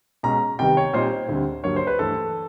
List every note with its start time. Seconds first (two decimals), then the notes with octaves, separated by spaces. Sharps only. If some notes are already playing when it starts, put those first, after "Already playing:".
0.23 B2 G#3 C#4 A#5
0.59 C3 D#3 G3 B3 G5
0.77 C#5
0.93 A#2 G3 C4 D#4 C5
1.28 D2 D3 G3 C4
1.64 G2 D3 F#3 A#3 C#5
1.76 C5
1.87 B4
1.99 G2 E3 A3 A4